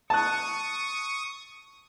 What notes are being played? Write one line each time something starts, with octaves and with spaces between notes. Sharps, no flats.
A5 C#6 D#6 F#6